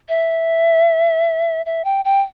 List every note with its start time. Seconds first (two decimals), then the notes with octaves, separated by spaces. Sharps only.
0.09 E5
1.66 E5
1.84 G5
2.05 G5